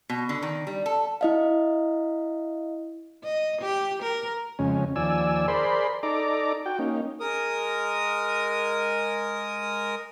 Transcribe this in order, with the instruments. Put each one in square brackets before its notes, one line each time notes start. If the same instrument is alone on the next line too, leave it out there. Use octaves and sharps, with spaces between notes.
[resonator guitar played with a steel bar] B2
D3
D#3
G3
A4
[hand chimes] E4 D#5 F5
[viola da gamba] D#5
G4
A#4
[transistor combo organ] F2 C#3 G#3 C#4
D#2 F3 D5 G#5 E6
G#4 A#4 C5 D5 B5 C6
D#4 A4 D5 A#5 D6
F#4 G5
A#3 C#4 D#4
[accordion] G#3 A#4 D#6